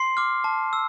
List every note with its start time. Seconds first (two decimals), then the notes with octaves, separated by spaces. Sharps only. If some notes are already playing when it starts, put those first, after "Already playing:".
Already playing: C6 C7
0.17 D6 F6
0.44 A5
0.73 E6